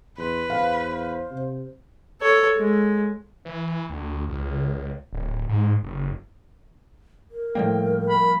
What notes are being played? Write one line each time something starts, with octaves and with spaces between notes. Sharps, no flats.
E2 B4 C6
E2 C5 F5
C3
A4 C#5
G#3
E3
D2
C#2
D1
G#2
F#1
A#4
A2 F3 G3 A#3 G5
B5